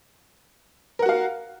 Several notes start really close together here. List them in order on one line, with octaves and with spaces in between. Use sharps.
A#4 F#5 F#4 F5